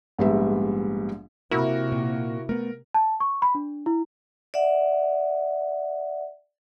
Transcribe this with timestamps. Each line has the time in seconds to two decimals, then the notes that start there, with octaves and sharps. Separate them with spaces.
0.18 A#1 G#2 G3 B3 E5
1.51 C3 A#3 E4 F#4 A#4
1.92 A#2
2.49 A3 B3 A#4
2.94 A5
3.20 C#6
3.42 B5
3.55 D4
3.86 E4
4.54 D5 E5 F#5